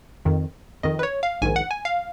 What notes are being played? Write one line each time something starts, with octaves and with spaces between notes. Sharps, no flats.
F2 D#3
F2 D#3 D#5
B4
C#5
F5
A#1 G#2 D#3 G#5
F#5
G#5
F5